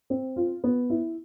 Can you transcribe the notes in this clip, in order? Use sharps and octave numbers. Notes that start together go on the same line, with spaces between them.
C4
F4
B3
E4